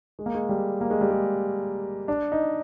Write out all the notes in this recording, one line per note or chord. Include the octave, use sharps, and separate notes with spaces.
G#3
A#3
G#3
G3
A#3
G#3
G3
G#3
D4
D#4